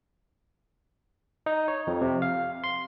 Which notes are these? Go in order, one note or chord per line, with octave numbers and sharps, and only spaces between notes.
D#4
C#5
F2
C3
F5
C6